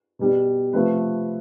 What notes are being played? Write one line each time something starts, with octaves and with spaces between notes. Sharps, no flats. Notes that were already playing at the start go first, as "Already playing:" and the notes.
B2 G3
C3 F3 A3 B4